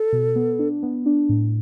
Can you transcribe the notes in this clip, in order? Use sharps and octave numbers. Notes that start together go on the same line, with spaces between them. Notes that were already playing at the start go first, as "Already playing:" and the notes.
Already playing: A4
B2
B3
D4
B3
D4
A2